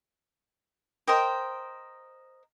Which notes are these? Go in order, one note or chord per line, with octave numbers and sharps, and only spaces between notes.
A#4 C5 D#5 G5